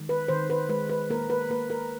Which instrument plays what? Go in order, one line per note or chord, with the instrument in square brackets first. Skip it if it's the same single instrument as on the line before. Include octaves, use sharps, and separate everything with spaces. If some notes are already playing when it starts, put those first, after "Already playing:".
Already playing: [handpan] D#3 G#3
B4
D#3 C5
B4
G#3 B4
B4
A#3 A#4
B4
A#3 B4
A#4